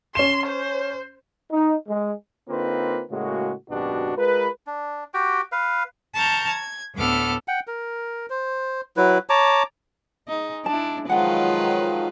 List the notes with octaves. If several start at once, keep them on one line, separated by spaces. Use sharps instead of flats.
C#4 C6 E7
C5
D#4
G#3
D3 A#3 C4 D#4 F4 B4
A2 C#3 G#3 A#3 F#4
G#1 F#2 B2 D4 F#4 G4
G#3 F4 A#4 B4
D4
F#4 G4 G5
B4 F5
A5 A#5 C#6 F6 G6
G#6
D2 A2 B3 A4 D6 F6
F#5 G5
A#4
C5
F#3 E4 B4
C#5 A5 A#5 D6
G#3 D#4
D4 E4 A5
D#3 F3 F#3 G#3 F4 B4 F#5 G5